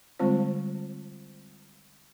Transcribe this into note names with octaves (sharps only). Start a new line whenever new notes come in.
D3 G3 G#3 C4 F4 C5